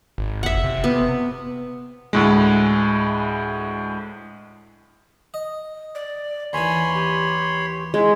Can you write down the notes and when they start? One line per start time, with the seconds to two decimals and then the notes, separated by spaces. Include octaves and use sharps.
0.18 G#1
0.43 F1 E5 F#5
0.64 C3
0.84 B3
2.13 D2 A2 G#3
5.34 D#5
5.95 D5
6.53 D#2 E3 C#5 G#5 B5 C6
6.94 G4
7.94 G#3 E4